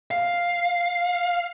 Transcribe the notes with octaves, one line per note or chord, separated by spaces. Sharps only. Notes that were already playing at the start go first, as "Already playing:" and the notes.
F5